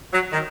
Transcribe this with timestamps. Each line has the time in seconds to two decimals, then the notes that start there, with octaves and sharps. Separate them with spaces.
0.13 F#3
0.32 D#3